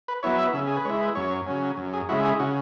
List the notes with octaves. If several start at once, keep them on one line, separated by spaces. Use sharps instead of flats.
B4
F#3 B3 E4 C#5
E5
C#3 E5
G#4
B4
G#3 E4 C#5
B4
F#2 C#5
C#3 F#3 C#4
F#2
G#4
C#3 G#3 E4 F#4
G#4
C#3 F#4